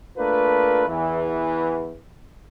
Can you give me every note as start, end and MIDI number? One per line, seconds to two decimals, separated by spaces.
0.17 0.83 57
0.17 0.83 58
0.17 0.83 62
0.17 0.83 65
0.17 0.83 71
0.88 1.97 40
0.88 1.97 52